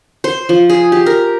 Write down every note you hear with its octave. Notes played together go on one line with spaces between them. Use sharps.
C5
F3
G#4
G4
A#4